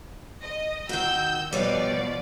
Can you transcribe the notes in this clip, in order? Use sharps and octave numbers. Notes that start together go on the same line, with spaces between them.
D#5
D#3 F#4 E6 G6
B2 F3 G3 B4 C#5 D5